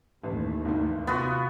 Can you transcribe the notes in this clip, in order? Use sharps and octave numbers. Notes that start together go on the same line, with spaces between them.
A1 D#2 E3 A3
G#1 D2 D#3
C3 B3 F4 F#4